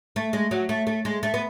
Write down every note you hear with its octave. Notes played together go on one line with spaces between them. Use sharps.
A3
G#3
F#3
A3
A3
G#3
A3
B3